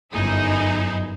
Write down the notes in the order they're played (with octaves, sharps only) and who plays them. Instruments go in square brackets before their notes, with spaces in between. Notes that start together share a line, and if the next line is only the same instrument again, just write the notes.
[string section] G1 F#2 D#4 E4 G#4